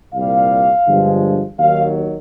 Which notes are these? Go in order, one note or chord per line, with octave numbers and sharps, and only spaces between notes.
C2 A#2 G3 F5
G1 G2 D3 F3 G#3
D#2 D#3 F#3 F5